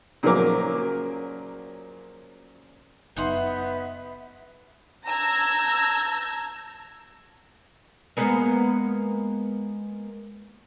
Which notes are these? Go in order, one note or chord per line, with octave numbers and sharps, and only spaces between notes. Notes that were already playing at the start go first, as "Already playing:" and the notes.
A#2 C#3 F3 F#3 A#4 D6
F#1 B3 D#4 E5 F#5 C6
A5 A#5 E6 G6 G#6 A#6
G#3 A#3 B3